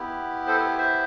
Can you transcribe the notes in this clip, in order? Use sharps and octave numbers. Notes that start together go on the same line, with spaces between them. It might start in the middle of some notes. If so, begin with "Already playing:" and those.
Already playing: B3 E4 G4
A4 C5
C5 E5